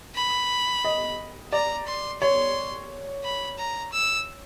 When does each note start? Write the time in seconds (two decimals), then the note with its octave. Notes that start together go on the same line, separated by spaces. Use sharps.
0.15 B5
0.85 D#5
1.52 D5 A#5
1.87 C6
2.21 C#5 C6
3.24 B5
3.59 A#5
3.93 E6